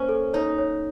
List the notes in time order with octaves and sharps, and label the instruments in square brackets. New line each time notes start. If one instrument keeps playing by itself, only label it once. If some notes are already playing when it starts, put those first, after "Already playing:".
Already playing: [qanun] A#3 C#4 [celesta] C5
[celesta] A4
[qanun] D#4 [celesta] C#5
[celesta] C#5